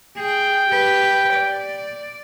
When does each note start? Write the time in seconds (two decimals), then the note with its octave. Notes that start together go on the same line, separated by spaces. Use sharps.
0.17 G#4 G5
0.68 G4 B4
1.34 D5